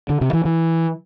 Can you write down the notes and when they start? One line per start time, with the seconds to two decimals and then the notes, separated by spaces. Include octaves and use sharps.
0.09 D3
0.21 C3
0.33 E3
0.45 E3